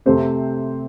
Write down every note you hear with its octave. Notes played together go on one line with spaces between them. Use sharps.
C3 A3 C4 G4 C5